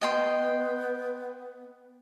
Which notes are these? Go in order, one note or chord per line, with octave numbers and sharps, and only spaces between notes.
B3 D#5 G5 C6